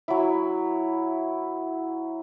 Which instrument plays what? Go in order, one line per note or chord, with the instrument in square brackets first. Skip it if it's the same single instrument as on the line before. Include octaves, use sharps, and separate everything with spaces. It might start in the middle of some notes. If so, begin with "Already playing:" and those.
[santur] F#3 E4